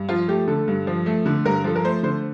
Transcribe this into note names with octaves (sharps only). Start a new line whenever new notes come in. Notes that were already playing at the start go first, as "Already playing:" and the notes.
Already playing: G2
F3 F4
A3 G4
D3 A4
G2
F3
A3
D3
G2 A#4
F3 A4
A#4
A3 C5
D3 C5